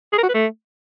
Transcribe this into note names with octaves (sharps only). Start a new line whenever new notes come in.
G#4
A#4
F#4
B4
A3